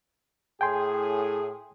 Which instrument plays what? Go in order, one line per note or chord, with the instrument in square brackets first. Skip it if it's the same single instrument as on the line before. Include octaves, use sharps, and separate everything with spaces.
[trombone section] A2 G#4 [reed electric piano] G5 G#5 C6